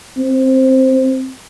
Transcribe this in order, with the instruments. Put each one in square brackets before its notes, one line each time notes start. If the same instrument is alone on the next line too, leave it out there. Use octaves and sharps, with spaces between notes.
[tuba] C4